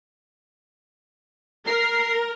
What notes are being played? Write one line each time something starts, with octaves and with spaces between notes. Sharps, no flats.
A#4 C7